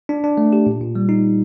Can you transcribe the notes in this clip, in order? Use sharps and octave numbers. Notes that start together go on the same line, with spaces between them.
D4
D4
A3
G4
A#2
A#2
G3
D#4